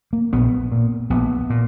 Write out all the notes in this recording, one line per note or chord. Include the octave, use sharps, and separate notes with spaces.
A#3
A#1 B3
A#2
A#1 B3
A#2